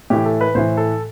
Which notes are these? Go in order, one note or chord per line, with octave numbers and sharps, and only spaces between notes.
A2 E3 G4
A4
B4
A2 E3 C5
A4